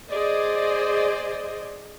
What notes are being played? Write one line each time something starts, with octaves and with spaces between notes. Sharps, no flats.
G#4 C5 D5 D#5